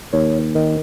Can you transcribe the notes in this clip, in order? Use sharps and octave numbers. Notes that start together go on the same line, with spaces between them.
D#2 C#5
D#3